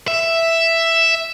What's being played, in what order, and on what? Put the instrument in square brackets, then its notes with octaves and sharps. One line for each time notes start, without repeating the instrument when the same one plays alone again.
[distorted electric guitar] E5